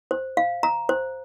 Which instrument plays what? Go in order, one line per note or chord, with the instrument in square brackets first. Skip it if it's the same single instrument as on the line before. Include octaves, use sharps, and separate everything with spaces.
[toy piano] C5
F5
A#5
C5